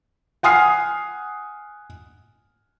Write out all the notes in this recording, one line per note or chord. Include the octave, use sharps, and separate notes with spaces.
F#5 G#5 D#6 F6 C7